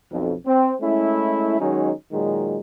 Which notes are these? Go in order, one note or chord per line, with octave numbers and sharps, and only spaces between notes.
B1 F2
C4
G#3 A3 C#4 E4
D#3 F#3 G#3 C#4 D#4
A#2 D#3 F#3 G#3